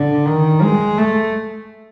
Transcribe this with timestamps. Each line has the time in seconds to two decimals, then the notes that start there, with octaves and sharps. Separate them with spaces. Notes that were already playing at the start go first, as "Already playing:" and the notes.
Already playing: D3
0.26 D#3
0.62 G#3
0.98 A3